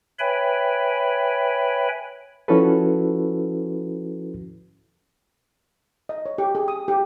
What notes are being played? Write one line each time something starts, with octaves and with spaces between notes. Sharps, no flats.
B4 C#5 E5 G5 G#5 B5
F3 C#4 E4 F#4 A4 B4
D#5
C#5
G4
G#4
D#6
G4